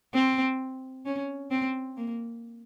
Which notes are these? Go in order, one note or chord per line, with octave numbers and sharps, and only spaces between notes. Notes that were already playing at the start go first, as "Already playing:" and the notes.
C4
C#4
C4
A#3